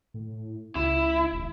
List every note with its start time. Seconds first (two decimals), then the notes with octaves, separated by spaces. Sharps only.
0.14 A2
0.75 C#2 E4
1.33 D#1